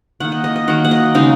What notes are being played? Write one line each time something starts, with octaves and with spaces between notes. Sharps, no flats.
D#3 A#3 F#5
D#5
D#5
D#5
D#3 F#3 A#3 F#5
F#5
D#5
C#3 G#3 D#4